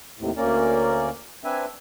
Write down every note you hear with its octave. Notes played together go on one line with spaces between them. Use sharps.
D#2 A2 C3
D2 A#3 C#4 A#4 D5
C4 D4 B4 E5 G#5